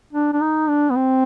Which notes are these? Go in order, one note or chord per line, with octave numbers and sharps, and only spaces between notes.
D4
D4
D#4
D4
B3
C4